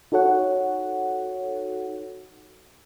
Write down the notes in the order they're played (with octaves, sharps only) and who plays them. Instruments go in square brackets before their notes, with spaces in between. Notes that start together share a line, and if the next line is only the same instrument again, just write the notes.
[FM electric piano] D#4 F#4 A4 C#5 F#5